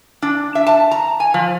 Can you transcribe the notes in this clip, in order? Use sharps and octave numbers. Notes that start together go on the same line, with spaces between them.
D4
E5
A5
A#5
G#5
F3